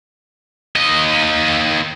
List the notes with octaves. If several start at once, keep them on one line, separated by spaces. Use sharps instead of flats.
D#2 D#5